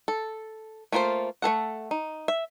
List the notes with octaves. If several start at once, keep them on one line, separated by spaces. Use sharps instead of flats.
A4
A3 A#3 F4 G#4 C5
A3 G#4 A4 F#5
D#4
E5